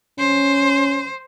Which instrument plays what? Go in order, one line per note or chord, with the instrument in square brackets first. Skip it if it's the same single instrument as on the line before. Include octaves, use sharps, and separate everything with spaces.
[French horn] C#4 [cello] C5